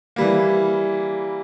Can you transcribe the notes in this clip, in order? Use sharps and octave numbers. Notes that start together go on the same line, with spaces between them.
E3 G3 A#3